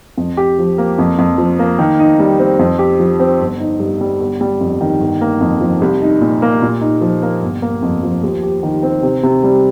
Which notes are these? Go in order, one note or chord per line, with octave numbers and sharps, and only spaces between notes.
F2
G4
F3
A#3
F2
F2
F3
A#3
D#3
D#4
G3
C4
F2
G4
F3
C4
G1
D#4
G2
G3
G1
G3
F2
D#3
G1
A#3
F2
F3
C2
D#4
A#2
A#3
A#2
D#4
F3
A#3
G1
A#3
F2
F3
D#2
G4
D#3
C4
C3
C3
G3